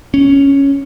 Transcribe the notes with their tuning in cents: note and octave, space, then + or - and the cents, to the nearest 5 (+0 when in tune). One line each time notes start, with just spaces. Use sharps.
C#4 +0